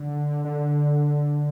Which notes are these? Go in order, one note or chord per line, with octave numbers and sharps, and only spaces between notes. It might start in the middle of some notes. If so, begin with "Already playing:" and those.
Already playing: D3
D3